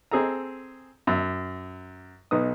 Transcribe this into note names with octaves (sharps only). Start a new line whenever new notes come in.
C4 G#4 A4 A#5
F#2 E5
B1 B3 D#4 D#6